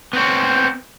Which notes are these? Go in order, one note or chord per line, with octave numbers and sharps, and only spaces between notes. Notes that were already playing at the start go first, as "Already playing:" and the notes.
B3 C4 C#5